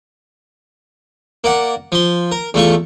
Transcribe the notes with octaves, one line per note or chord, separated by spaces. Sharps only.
A#3 D5 F#5
F3 C6
A#4
E2 A3 F4 C#6